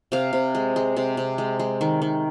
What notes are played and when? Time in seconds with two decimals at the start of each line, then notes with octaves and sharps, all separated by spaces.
0.12 C3 F5
0.33 C3
0.55 G#3
0.76 G#3
0.97 C3
1.17 C3
1.38 G#3
1.59 G#3
1.81 D#3
2.02 D#3